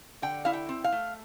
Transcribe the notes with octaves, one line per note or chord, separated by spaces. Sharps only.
D3 G5
E4 F5
G5
C4
F5
A3